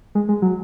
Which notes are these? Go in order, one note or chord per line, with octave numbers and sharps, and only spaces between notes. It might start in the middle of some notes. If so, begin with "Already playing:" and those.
G#3
G#3
F#3